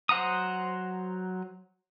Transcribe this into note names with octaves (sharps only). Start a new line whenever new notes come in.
F#3 C5 F#5 A#5 D#6